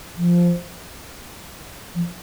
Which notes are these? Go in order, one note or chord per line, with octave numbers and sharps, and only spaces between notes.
F3
F3